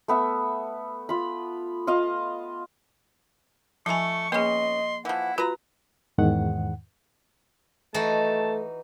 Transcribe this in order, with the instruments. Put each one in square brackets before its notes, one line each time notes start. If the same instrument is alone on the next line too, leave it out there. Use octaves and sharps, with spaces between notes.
[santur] A3 B3 E5
F4 B5
F4 D#5 F5
[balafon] F3 G#5 [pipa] A3 E4 [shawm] C#6
[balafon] A#3 G#4 [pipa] B3 C#4 [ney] D#5 [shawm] C6
[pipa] E3 F3 [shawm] E4 [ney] F#5
[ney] F4 [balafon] F#4 [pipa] B4 A#5
[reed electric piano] E2 G#2 D#3 F#5
[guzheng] E3 D#4 F#4 [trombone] A3 [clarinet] A5